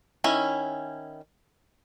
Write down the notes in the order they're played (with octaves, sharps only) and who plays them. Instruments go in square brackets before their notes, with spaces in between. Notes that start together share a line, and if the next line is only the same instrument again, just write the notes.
[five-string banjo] D#3 C#4 E4